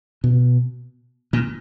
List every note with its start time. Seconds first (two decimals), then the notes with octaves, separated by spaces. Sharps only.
0.24 B2
1.33 A#2